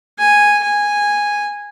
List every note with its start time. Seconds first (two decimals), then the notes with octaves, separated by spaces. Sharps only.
0.19 G#5
0.63 G#5